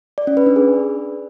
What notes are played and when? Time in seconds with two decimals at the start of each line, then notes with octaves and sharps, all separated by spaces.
0.18 D5
0.27 C#4
0.37 B4
0.46 D4
0.56 G#4